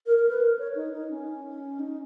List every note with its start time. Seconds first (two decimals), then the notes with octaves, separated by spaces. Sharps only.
0.06 A#4
0.17 A#4
0.29 B4
0.41 A#4
0.59 C#5
0.75 D#4
0.93 D#4
1.11 C#4
1.79 D#4